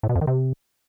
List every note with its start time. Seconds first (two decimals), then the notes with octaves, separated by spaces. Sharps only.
0.03 A2
0.09 B2
0.15 F2
0.21 D#3
0.27 C3